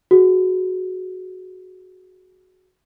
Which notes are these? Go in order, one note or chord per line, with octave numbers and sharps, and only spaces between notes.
F#4 G#4